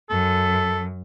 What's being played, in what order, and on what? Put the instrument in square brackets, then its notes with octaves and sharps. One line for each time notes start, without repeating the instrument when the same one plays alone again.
[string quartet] F#2 [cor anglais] A4